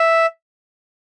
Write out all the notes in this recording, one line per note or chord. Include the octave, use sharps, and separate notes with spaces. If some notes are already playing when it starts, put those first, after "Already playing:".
Already playing: E5